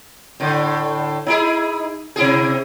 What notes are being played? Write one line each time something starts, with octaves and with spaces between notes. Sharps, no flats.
A2 D3
D#4 E4 G#4
C3 E4 G#4